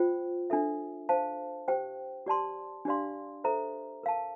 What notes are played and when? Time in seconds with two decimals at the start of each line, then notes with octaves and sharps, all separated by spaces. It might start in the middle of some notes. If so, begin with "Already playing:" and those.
Already playing: F4 C5 G5
0.50 D4 A4 E5
1.09 C5 F5 A5
1.68 G4 C5 G5
2.27 G4 D5 A5 C6
2.85 D4 G4 D5 F5 C6
3.44 A4 C5 E5 A#5
4.03 A#4 F5 A5